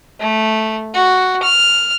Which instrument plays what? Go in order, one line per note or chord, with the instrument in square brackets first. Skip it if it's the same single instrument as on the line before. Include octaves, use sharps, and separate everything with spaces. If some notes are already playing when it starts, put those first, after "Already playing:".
[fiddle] A3
F#4
F6